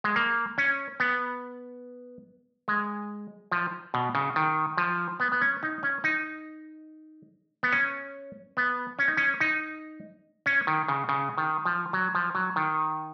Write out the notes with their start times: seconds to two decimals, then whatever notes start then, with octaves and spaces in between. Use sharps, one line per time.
0.04 G#3
0.16 A#3
0.58 C#4
1.00 B3
2.68 G#3
3.52 F3
3.94 B2
4.15 C#3
4.36 D#3
4.78 F3
5.20 B3
5.32 B3
5.41 C#4
5.63 D#4
5.83 C#4
6.04 D#4
7.63 B3
7.73 C#4
8.57 B3
8.99 C#4
9.08 D#4
9.17 C#4
9.40 D#4
10.46 C#4
10.67 D#3
10.88 C#3
11.09 C#3
11.38 D#3
11.65 F3
11.93 F#3
12.15 F3
12.35 F#3
12.56 D#3